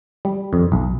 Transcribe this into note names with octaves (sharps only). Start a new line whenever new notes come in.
G3
F2
B1